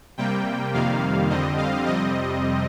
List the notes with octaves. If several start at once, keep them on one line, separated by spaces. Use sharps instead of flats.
C3 G3 A#3 G5
F2 C3 D#3 G3 A#3 F5
F2 D3 G3 C4 D#5
F5
F2 C3 G3 C4 D#5